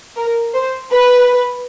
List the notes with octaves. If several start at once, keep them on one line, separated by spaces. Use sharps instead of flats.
A#4
C5
B4